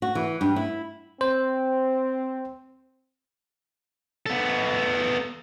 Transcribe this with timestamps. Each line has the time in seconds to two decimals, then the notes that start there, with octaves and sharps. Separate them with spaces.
0.02 F#4
0.15 E3
0.41 G2
0.56 E4
1.21 C4 C5
4.26 B3 A4